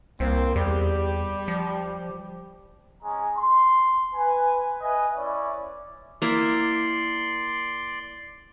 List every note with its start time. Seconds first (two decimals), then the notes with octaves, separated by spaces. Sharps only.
0.20 C2 A#3 C4
0.56 E2 G3 G4
1.48 F3
3.03 G#3 C#4 G#5 A#5
3.36 C6
4.13 B4 G#5
4.81 B4 D#5 E5 G#5
5.16 C#4 E4 D5
6.22 A#3 E4 D5 C6